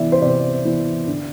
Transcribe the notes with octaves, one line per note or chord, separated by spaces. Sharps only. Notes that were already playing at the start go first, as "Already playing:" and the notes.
Already playing: C3 E3 B3 D5 E5
C5
C3 D5
E3 B3
D3